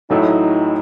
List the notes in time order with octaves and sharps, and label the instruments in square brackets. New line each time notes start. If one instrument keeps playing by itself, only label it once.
[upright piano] A1 A2 F#3 A3 E4 [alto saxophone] D#4